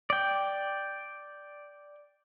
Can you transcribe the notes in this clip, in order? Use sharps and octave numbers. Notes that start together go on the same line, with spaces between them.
D5 G5